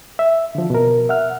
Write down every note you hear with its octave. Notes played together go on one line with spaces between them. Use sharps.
E5
D3 F3
B2 A#4
E5 F#5 F6